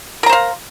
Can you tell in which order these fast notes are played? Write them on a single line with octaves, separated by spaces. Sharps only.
A#4 A#5 C5 F5